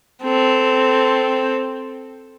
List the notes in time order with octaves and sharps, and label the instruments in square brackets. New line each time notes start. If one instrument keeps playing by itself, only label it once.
[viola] C4 A4